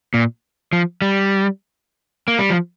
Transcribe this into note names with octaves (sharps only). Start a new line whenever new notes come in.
A#2
F3
G3
A#3
G3
F3